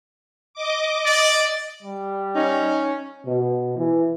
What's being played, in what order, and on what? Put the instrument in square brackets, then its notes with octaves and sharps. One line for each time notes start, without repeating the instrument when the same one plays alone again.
[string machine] D#5 D6
[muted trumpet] D5
[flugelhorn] G3
[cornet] C#4 [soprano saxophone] D#4
[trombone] B2
E3